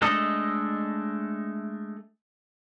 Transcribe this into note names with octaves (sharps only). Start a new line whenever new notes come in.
G#3 A3 D4 A4 D#5